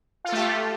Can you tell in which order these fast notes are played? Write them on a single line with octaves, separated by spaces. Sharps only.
F4 A4 A3 G4